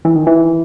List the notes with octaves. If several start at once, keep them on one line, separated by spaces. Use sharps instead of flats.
E3
D#3
E3